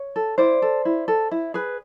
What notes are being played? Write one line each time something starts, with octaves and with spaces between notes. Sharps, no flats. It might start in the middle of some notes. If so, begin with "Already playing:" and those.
Already playing: C#5
A4
E4 C5 D5
A4
E4
A4
E4
G#4 B4